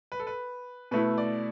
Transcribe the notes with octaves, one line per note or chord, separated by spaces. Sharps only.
B4
A4
B4
B2 A3 E4 B4
D5